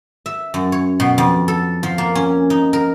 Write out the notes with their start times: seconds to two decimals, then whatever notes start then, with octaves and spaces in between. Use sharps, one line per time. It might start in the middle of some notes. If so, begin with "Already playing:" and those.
0.26 E5
0.54 F#2
0.72 C#5
1.00 B2
1.18 F2
1.48 A4
1.83 F3
1.98 A#3
2.15 C#4
2.50 D#4
2.73 A#4